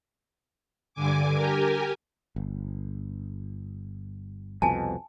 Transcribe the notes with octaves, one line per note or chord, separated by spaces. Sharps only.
G2 D3 G#5 D6
G4 A#4 G#5
G1
C2 F2 B2 G#5 A5